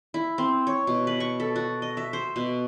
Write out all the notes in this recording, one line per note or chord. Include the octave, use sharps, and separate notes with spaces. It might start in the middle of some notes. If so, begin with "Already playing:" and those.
E4
C4
C#5
B2
B4
C#6
A4
F#4
D#5
E5
C5
B2